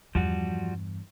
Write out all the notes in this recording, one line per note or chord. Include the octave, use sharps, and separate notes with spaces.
E2 G2 F3 G3 F#4